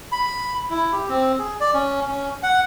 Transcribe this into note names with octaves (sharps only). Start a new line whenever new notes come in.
B5
E4
G4
C4
G#4
D5
C#4
C#4
F#5